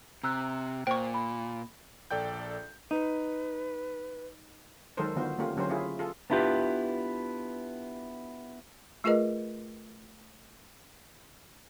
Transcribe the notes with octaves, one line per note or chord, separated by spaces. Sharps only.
C3 A#5 E6 F#6
A#2 C5 G5 C#6
B5
A#1 A4 D5 G5 G6
D#4 B4
D#3 F#3 G#3 A4 A#4 C5
D3 D#3 B3 F4 F#4 C5
A3 A#3 C#4 F4 G4
D3 F#3 C#4 G4 A#4 C5
C#4 E4 F4 G#4
F4 G#4 A4
B3 D4 E4 F4 G4 B4
A3 F4 G#4 A#4 B4 D#5